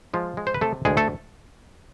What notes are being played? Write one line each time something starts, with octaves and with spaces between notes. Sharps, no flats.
F3 G#3 F4
G#3
C5
B4
C3 A3 A4
D2 G#3 G#4
A3 A4